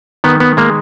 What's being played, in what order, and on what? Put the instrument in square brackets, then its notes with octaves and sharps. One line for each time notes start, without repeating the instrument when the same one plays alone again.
[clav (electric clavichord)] D#3 B3
B3
G#3 A#3